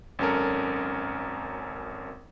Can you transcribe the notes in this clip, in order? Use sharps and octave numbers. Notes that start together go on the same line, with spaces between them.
G#1 F#2 C#4 A4 A#4